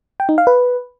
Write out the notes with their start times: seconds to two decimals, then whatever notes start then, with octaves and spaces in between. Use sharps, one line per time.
0.20 G5
0.29 D#4
0.38 F5
0.47 B4